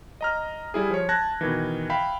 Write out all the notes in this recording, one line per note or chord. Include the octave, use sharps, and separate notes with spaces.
D#5 A#5 F6
G3 E4 G#4
F3 C#5
A5 F#6 G#6 A#6
B2 D#3 E3
E5 F5 G5 B5